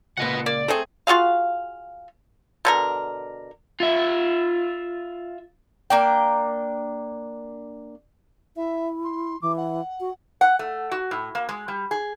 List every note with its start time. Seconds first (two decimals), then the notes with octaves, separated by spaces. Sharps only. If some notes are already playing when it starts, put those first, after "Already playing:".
0.17 C#2 A#2 B4 D#5 F#5
0.46 A#3 D5
0.68 A3 C4 G#4 A4
1.07 F4 F#4 G#4 F5
2.65 B2 D3 A#4
3.80 F4 E5
5.90 A#3 D4 G5
8.56 E4 E5
9.04 C6
9.42 E3 D6
9.57 F#5
10.00 F#4
10.41 F#5
10.59 A3
10.91 F#4
11.11 A2
11.35 A#3
11.49 G#3
11.68 G3
11.91 G#4